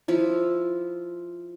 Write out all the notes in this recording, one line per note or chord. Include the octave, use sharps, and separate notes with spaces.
F3 E4 F4